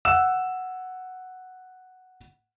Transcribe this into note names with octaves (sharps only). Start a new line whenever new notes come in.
F#5 E6 E7